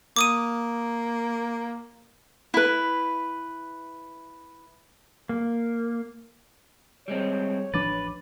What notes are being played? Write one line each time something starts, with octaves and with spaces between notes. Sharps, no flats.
A#3 D6 D#6 D#7
E4 B4
A#3
G3 G#3 C4 C#5
A1 F3 D4 B4 D6 A6